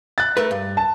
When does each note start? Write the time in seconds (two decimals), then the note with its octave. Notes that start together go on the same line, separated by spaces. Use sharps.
0.18 F#6 A6
0.37 A3 A#4 B4
0.51 G2
0.77 A5